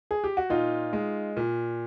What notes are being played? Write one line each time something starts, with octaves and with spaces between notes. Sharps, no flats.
G#4
G4
F#4
A#2 D#4 F4
G#3
A#2